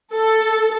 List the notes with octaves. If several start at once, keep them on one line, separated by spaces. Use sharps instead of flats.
A4